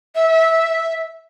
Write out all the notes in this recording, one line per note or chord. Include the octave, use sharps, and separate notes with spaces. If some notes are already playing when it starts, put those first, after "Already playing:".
E5